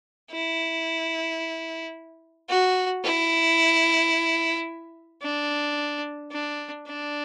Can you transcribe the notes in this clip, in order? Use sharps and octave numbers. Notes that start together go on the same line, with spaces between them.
E4
F#4
E4
D4
D4
D4